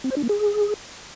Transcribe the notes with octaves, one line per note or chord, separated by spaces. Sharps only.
C4
C5
D4
A#3
G#4